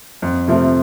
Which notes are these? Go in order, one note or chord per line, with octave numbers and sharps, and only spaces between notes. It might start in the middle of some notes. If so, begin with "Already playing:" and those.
F2
C3 F3 A3 C4